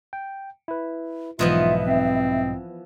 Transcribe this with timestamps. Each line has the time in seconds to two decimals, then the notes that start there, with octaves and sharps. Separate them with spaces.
0.13 G5
0.68 E4 B4
1.39 B1 G#2 E3 F3 B3 F4 D#5 E5
1.84 C4